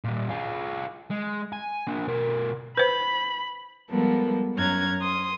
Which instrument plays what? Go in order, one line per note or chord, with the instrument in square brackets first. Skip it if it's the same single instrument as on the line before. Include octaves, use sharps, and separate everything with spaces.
[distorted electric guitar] A#2 G3
F4 G#4
G#3
G#5
A#3 D4
B2 A#4
[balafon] B4 C5 [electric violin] B5
[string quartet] F3 G3 G#3 B3 A4 A#4
F#2 C#4 A#5 F6 F#6 G#6
C6 D#6